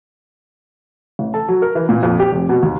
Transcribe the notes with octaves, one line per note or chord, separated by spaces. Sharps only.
A1
A4
F#3
A#4
E3
A#2
F2
G4
F1
B2
D#2